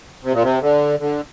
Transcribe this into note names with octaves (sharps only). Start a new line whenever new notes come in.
C3
A#2
C3
D3
D3